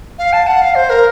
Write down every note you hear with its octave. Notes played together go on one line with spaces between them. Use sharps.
F5
A5
F#5
F5
C5
A#4